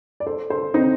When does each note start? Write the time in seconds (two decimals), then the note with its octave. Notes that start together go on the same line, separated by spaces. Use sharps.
0.20 D5
0.26 A4 C5
0.50 A4 C5
0.74 C4 D#4